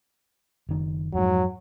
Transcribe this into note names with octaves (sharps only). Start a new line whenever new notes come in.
F#1 D#3
F2 G#2 F#3